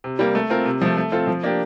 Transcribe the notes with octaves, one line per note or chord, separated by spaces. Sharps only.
C3
G3 A#3
A3
C4 F4 A#4
C3
F3 A3
A3
C4 F4 A4
F3
A#3 D4 G4